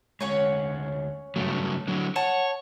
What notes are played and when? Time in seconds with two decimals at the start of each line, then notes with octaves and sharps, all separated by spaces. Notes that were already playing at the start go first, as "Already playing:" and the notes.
0.21 D2 G#3 C#4 C#5 F#5
1.36 G2 C#3 F#3 A3
1.88 D3 F#3
2.16 C#5 F#5 A5